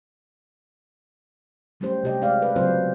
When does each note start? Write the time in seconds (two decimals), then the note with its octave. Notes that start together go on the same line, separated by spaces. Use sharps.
1.80 F#3 G3 A3 C#4 G4 C5
2.03 C3 G4 D#5
2.22 G#3 G4 D5 F5
2.42 B4
2.56 C#3 F#3 B3 C4 F4 C5